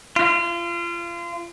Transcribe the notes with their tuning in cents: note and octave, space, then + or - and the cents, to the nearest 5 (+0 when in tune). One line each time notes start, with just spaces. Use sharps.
F4 -30